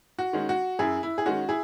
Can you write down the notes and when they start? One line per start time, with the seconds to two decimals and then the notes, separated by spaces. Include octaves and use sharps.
0.19 F#4
0.33 D#3 G#3 C#4
0.49 F#4
0.79 F#2 E4 G#4
1.03 E4
1.18 G#4
1.26 D#3 G#3 C#4 F#4
1.49 E4 G#4